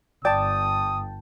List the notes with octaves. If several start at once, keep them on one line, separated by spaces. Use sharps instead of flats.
G1 D5 G5 A5 D#6